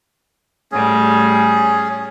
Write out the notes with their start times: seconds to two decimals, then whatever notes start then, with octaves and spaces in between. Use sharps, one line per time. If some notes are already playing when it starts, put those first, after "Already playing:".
0.72 A2 G3 C#4 G#4